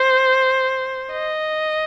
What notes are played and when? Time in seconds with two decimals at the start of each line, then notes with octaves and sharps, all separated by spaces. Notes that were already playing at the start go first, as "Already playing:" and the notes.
Already playing: C5
1.12 D#5